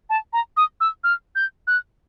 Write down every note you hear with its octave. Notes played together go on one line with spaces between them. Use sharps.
A5
A#5
D#6
E6
F6
G6
F#6